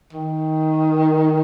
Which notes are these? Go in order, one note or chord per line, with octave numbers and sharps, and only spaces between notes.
D#3